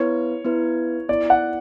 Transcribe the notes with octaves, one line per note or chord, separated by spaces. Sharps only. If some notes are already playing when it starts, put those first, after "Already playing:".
Already playing: B3 E4 B4 C#5
B3 E4 B4
B3 E4 B4 D5
F#5